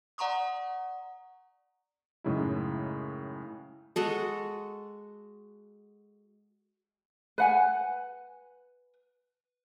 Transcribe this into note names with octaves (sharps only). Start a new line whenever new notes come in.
D5 F#5 A#5 C6 C#6 D#6
F#2 A2 C#3 G#3 D#4 E4
G#3 F#4 A4
B4 F#5 G#5